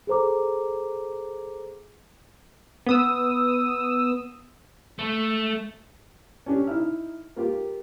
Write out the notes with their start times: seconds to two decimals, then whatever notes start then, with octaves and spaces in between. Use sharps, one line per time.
0.07 G#4 A4 C5 A#5 D6
2.87 B3 D#6 E6
4.99 A3
6.46 C#4 D4 G4
6.67 D#4 E4 F6
7.36 A#3 F4 G4